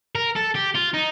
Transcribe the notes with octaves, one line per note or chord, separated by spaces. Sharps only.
A#4
A4
G4
F4
D#4